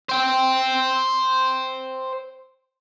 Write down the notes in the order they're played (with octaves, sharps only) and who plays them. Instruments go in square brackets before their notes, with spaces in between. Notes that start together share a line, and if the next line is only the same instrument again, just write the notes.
[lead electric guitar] C5 G5